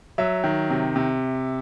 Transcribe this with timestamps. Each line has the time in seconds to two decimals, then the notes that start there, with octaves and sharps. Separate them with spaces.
0.18 F#3 E5
0.44 D#3
0.70 C3
0.96 C3